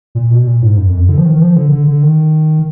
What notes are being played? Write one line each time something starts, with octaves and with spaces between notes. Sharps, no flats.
A#2
B2
A#2
G#2
F#2
F2
F#2
D3
F3
D#3
D#3
F3
D3
D3
D3
D#3